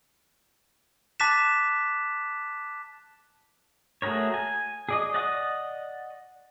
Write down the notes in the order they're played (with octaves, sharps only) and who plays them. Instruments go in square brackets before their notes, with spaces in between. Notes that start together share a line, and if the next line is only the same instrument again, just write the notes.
[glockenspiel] A5 D6 F#6 A6 B6 E7
[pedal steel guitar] A3 F#4 G#4 A#4 C#5
G#5
G#4 D5 D#5
D5 D#5 F#5 C#6 D#6